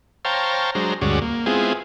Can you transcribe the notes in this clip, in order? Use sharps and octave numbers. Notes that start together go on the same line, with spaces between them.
C5 C#5 F5 G5 A5 A#5
F#3 G#3 D4 C5 A#5
D2 G2 G#3 C#4 F#4 D5
A#3
G#3 B3 C4 E4 F4 G#4